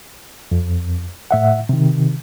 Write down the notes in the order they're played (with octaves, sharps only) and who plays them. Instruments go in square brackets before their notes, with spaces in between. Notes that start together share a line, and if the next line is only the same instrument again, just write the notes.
[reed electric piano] F2
A2 E5 F#5
C3 D#3